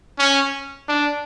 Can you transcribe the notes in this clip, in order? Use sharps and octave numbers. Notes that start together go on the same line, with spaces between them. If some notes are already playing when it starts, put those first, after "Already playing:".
C#4
D4